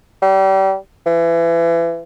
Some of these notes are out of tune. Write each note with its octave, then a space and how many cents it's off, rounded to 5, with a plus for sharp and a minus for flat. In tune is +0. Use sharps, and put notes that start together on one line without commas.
G3 -30
E3 +30